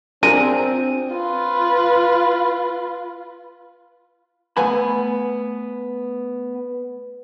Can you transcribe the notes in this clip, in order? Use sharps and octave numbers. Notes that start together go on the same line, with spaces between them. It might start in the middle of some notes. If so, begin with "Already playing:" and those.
C4 D4 F4 G#4 A#4 D#7
F4 B4
A3 B3 B4 G#5 B5